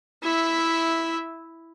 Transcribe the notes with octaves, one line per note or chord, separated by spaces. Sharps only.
E4 E5